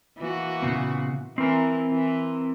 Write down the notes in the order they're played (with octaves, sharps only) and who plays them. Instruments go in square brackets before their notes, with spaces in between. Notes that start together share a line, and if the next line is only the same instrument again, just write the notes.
[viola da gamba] E3 A#3 F#4
[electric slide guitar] A#2 C#3 B3
[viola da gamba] E3 [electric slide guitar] C4 A#4
[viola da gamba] E3